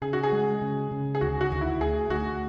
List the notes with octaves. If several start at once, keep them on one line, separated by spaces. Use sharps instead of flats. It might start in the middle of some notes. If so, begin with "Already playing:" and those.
C#3 G#4
F#4
G#4
G#3
C#3
C#3
G#4
D2 F#4
F#4
D2
E4
D2 G#4
D2 F#4